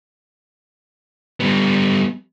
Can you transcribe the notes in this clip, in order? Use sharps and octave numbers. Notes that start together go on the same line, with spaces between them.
G3 B3